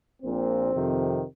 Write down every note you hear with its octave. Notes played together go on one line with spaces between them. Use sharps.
A#1 A#2 C4
F2 C3 D#3